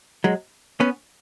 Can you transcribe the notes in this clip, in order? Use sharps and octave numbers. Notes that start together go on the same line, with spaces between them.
F#3 G#3
B3 C#4